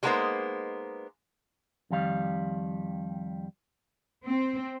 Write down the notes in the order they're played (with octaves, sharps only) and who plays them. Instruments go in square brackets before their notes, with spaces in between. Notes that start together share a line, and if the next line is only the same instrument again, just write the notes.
[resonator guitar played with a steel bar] G3 G#3 A#3 B3 D#4 C5
[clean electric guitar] F2 D#3 G3 F5
[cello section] C4